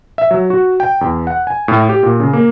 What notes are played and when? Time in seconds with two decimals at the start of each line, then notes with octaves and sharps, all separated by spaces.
0.18 E5
0.31 F#3
0.50 F#4
0.80 G5
1.01 E2
1.27 F#5
1.47 G#5
1.68 A2
1.89 G4
2.03 A#2
2.20 C#3
2.33 A#3